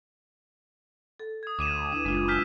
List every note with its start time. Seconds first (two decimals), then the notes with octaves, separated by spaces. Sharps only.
1.19 A4
1.43 D#6 G#6
1.59 D2 D6 D#7 E7
1.92 D4 E4 B4
2.05 F#1 G#3 D4 F4
2.28 G#5 E6 F6 G6 B6